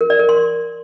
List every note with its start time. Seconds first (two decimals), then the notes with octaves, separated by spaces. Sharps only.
0.01 A#4
0.10 D5
0.19 A#4
0.29 C6